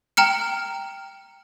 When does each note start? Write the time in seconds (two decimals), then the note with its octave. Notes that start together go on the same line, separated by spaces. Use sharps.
0.17 G5 A#5 F6 C#7